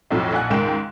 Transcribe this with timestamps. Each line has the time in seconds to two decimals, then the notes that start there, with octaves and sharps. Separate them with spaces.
0.11 B1 F2 A2 F3 F#3
0.33 A#1 F#5 G#5 F#6
0.50 C#2 G#2 D#3 G5 E7